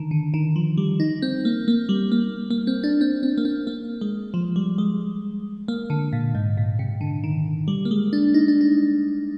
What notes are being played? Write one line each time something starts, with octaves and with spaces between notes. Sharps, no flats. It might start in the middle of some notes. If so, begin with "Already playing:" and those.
Already playing: D3 D#3
D3
D#3
F3
G3
D#4
C4
A#3
A#3
G3
A#3
A#3
C4
D4
C4
C4
A#3
C4
A#3
G#3
F3
G3
G#3
A#3
D3
A#2
G#2
A#2
C3
D3
D#3
G3
A#3
G#3
D4
D#4
D4
D#4